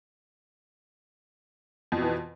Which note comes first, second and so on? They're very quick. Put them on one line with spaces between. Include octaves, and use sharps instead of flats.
F2 B2 E3